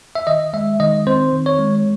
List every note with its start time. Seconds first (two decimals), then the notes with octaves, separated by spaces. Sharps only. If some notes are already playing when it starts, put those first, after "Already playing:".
0.15 E5
0.27 D#3 D#5
0.53 G#3 E5
0.80 D#3 D#5
1.07 C4 C5
1.33 D#3
1.46 C#5
1.59 G#3